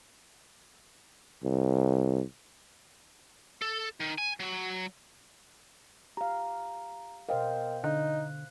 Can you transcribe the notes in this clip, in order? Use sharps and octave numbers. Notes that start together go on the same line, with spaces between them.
C2
A4
D#3
G#5
F#3
G4 F5 A#5
B2 A#4 C5 D#5 F5 G5
D3 D#4 F#6